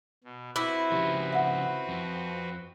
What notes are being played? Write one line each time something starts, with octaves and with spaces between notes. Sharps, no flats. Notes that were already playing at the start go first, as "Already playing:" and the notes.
B2
C4 E4 F#4 B4 D6
C#3 F3 G4
E5 F#5
F2